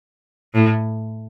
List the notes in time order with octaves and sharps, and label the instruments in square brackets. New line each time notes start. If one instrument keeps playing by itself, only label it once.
[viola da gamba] A2